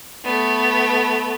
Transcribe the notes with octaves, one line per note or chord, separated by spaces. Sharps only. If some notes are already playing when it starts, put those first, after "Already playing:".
A3 B3